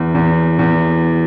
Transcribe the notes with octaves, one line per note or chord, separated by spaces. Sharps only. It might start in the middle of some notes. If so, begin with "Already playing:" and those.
Already playing: E2
E2
E2